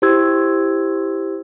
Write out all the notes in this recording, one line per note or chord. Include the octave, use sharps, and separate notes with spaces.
E4 G4 C5 C6 E6 G#6